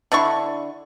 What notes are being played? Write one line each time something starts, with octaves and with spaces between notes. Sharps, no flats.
D3 D4 E4 C#6